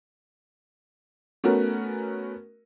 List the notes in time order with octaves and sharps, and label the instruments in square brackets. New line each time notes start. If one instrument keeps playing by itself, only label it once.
[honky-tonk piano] A3 B3 C#4 F#4 A#4